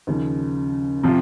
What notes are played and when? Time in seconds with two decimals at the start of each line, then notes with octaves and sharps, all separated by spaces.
0.07 D#2 C#3 F3
1.03 C3 F3 C4 F4